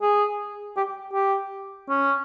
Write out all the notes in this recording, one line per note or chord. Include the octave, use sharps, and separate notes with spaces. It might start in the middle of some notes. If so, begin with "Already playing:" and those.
G#4
G4
G4
C#4